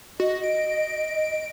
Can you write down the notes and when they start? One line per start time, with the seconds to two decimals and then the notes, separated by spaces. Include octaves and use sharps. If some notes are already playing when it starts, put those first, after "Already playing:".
0.20 F#4 D#5
0.44 D7